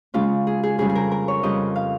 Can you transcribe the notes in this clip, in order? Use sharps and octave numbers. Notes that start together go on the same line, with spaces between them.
C#3 G#3 C#4 F4
G#4
G#4
F2 C#3 G3 G#4
G#4
A#4
A#4
C#5
F2 C#3 G3 D#5
F5